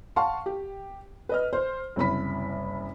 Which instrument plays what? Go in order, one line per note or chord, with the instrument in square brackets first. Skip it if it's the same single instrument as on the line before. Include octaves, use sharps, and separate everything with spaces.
[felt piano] F5 F#5 A5 C6 C#6
G4
B4 D#5 F6
C5
F#1 C2 B5 B6